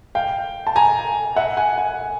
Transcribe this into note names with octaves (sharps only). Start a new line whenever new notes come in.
F5 G5
A5
G#5 A#5
E5 F#5
F#5 G#5
F#5 G#5